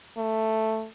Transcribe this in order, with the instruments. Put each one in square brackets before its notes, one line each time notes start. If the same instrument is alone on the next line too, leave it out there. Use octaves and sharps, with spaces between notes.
[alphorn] A3